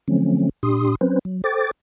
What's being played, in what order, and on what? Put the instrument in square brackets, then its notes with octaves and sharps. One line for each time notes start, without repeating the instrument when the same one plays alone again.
[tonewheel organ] D3 F3 F#3 A3 C4 C#4
A#2 D4 G4 C6 D#6
F#3 C4 C#4 B4 C5
F#3
A4 C5 G5 D6 A6